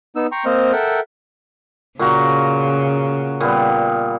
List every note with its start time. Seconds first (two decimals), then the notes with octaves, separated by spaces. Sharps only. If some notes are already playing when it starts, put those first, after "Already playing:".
0.16 B3 D#4 E6
0.32 G5 A#5 C6 C#6
0.45 A#3 C4 C5 D#5 F6
0.72 A4 A#4 E5 F#5 G5
1.99 A#2 C#3 F#4 A#5
3.40 A#2 G3 B3